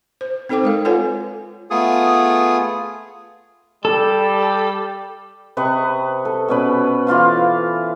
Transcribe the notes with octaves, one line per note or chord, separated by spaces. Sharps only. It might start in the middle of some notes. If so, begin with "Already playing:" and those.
C5
C4 D#4 A4 C5 G5 D6
G#3 A#4 F5
F4 A4 B4 C#5 F#5 G#5
A3 B3 F4 G#4 D#6
G3 A4
C3 B4 D#5 C#6
A4
B2 C#4 B4
E3 F4 F5 C6